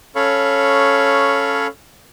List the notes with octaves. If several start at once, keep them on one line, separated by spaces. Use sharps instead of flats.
C#4 A4 C#5 F5 B5 C#6